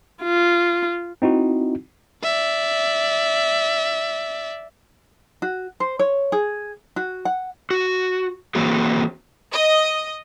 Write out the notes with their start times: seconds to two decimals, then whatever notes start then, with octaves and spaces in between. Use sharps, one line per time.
0.23 F4
1.22 C4 D#4 E4 F#4
2.23 D5 E5
5.42 F#4
5.80 C5
5.99 C#5
6.32 G#4
6.96 F#4
7.25 F#5
7.71 F#4
8.55 E3 A#3 C4 F#4 G#4
9.53 D#5